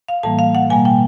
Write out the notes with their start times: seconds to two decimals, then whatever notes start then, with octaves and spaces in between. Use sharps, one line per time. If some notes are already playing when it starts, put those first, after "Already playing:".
0.08 F5
0.23 A2 E3 G3 A#3 A5
0.39 F5
0.55 F#5
0.70 B2 G3 A#3 G#5
0.85 G5